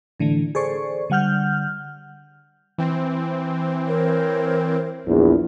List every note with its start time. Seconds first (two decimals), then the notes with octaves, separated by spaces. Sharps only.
0.20 A2 D3 E3 A3
0.55 G#4 A4 C5 D5 C#6
1.10 D3 G3 F#5 F6 G6
2.78 E3 C4
3.87 A#4 C5 C#5
5.06 A#1 E2